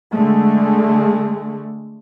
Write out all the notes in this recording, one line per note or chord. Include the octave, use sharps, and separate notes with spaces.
D3 G#3 A3